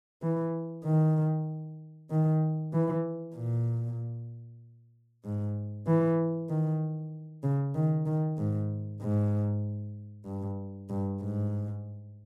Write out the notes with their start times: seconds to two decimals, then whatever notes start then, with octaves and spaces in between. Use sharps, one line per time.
0.22 E3
0.85 D#3
2.10 D#3
2.73 E3
3.36 A#2
5.25 G#2
5.87 E3
6.50 D#3
7.43 C#3
7.75 D#3
8.06 D#3
8.38 G#2
9.01 G#2
10.26 G2
10.90 G2
11.21 G#2